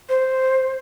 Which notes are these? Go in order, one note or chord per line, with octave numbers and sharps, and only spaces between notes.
C5